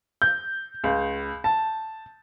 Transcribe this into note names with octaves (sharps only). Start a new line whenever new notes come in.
G6
C#2
A5